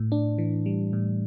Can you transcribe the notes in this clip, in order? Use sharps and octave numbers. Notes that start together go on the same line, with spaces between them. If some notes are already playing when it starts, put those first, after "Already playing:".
Already playing: A2
D4
E3
G3
A2